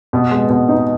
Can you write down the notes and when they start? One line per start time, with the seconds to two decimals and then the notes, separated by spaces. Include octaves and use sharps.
0.13 B2
0.31 G#3
0.49 B2
0.69 D#4